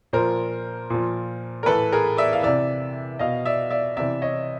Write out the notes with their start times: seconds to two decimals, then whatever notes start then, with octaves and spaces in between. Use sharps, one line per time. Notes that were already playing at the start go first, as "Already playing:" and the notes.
0.13 A#2 F3 A#4 C5
0.90 A#2 F3
1.63 A#4
1.66 A2 E3 A4 B4
1.92 G#4 A#4
2.17 D5 E5
2.33 F5
2.43 C3 E3 D5 E5
3.19 B2 D#5 F5
3.45 D5 E5
3.70 D5 E5
3.97 C3 E3 D5 E5
4.22 C#5 D#5